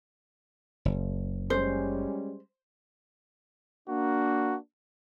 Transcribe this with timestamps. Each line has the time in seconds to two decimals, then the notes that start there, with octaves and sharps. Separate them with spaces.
0.85 F#1
1.50 G3 G#3 C#4 C5
3.89 A#3 D4 F#4